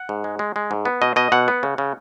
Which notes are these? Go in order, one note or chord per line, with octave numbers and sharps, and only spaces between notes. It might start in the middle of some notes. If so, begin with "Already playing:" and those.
Already playing: F#5
G#2
G#3
G#3
G#3
G#2
B3
B2 D#5
B2 D#5
B2 F#5
B3
C#3
C#3